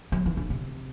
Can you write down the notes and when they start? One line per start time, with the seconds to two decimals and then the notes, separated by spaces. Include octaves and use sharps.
0.12 F#3
0.26 E3
0.37 D3
0.50 C3